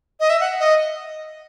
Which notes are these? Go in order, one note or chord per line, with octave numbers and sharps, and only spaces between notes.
D#5
E5
F#5
D#5